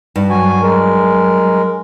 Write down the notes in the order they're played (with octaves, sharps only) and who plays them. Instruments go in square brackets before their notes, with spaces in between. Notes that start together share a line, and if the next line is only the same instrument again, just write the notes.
[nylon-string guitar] G2
[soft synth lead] F#3 [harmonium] F#4 G#5
[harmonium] G#3 A#4